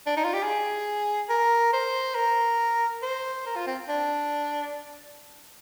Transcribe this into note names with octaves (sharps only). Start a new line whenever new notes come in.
D4
D#4
F4
G4
G#4
A#4
C5
A#4
C5
A#4
F4
C4
D4